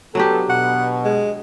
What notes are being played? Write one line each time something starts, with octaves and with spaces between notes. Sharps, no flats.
F#3 B3 D4 G4 A4
B2 F#5
G#3